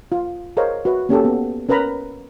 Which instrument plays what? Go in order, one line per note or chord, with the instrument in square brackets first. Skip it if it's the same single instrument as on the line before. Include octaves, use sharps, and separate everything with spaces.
[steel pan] F4
G#4 A#4 C5 C#5 D#5 F5
F#4 B4 E5
A#3 C#4 G4 A4
B3
C#4 A#4 B4 A#5 B5